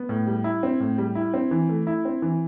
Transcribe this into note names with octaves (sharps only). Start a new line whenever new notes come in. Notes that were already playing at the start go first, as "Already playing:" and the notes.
Already playing: B3
A2
G3
E4
C4
A2
G3
E4
C4
E3
A3
E4
C4
E3